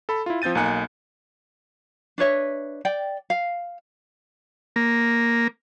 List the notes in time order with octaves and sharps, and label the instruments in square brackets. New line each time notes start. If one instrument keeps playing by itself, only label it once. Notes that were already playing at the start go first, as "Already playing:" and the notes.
[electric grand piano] A4 B5
E4 F4
F3 C4 G6 A6 D#7
B1 A#3 D#4 G#5 F#6 C#7
[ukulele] D4 B4 C#5 E5
D5 G5
F5
[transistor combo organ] A#3